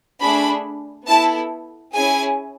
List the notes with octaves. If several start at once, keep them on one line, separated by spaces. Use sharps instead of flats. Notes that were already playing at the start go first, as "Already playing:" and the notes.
A3 D4 G#4 B5
B3 E4 A4 A5
C#4 E4 G#4 G#5